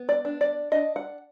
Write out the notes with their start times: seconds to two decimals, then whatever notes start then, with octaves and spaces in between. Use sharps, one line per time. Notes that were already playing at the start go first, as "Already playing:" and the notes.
Already playing: B3
0.09 D5
0.25 D4
0.41 D5
0.72 D4 D#5
0.96 F#5